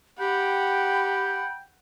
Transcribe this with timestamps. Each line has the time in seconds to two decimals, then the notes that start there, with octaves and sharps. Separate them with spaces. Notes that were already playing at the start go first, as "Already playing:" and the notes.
0.19 G4 F#5 G5 B5